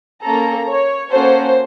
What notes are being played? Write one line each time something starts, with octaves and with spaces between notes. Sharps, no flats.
A#3 C#4 A4 A#5
C#5
A#3 C#4 F#4 A4 C5